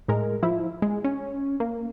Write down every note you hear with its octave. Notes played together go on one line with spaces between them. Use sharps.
A2 G#3 A#4
F3 E4
G#3
C#4
A#3